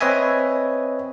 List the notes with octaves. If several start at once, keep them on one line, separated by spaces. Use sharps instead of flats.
C4 B4 C#5 D#5 E5 G#5